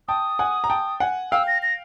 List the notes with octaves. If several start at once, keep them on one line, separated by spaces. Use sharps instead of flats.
G5 A5 D#6
F#5 G#5
A#5
G5 A5
F#5 G#5
F5 G5 E6
A#6
A#6